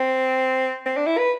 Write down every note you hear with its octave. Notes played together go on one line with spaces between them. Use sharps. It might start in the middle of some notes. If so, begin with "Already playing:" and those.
Already playing: C4
C4
D4
E4
B4